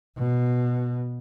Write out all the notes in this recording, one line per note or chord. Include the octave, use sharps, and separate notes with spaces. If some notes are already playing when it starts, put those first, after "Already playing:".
B2